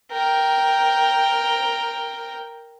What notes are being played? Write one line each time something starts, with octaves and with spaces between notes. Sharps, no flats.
A#4 G5